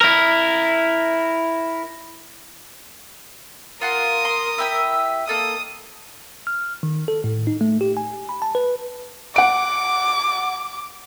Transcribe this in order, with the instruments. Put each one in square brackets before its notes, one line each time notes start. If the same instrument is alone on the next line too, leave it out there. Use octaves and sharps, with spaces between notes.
[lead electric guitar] E4 A#4
[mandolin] F4 F#5 C6 [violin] A#4 D#6
[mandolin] C6
E4 G4 E5
[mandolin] A#3 A4 D#5 [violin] D#6
[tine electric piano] F6
D#3
A4
A2
D#4
A3
G4
G#5
B5
A5
B4
[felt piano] F#5 D7 [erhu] D6